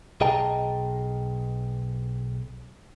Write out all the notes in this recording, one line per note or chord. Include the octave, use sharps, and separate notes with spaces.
B1 G#4 D#5 G5 A5 A#5